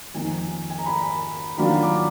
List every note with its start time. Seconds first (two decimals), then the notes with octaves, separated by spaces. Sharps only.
0.14 F2 D#3 A#3 D#4 G#5
0.70 G#5
0.79 A#5
0.86 B5
1.58 D#3 F#3 A#3 D4 F4 B5
1.83 D6